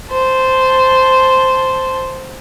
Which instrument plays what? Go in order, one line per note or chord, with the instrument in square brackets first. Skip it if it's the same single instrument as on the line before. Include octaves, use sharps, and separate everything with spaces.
[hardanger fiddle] C5 A5